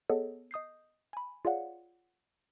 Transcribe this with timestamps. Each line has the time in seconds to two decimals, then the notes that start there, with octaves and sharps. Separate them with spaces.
0.10 B3 G#4 A4 C#5 D#5 F#5
0.51 D#5 D#6 G6 C7
1.13 G#5 B5
1.45 F4 G#4 C#5 D5 F5 F#5